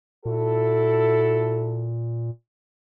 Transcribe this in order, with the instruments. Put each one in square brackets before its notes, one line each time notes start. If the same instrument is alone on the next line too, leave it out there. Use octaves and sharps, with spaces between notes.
[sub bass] A#2 [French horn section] E4 F#4 A4